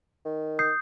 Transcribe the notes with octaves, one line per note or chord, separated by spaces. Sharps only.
D#3
D#6 G6 C7